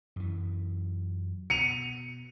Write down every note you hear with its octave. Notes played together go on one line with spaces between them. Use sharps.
F#2 E3
B2 C#7 D#7 F7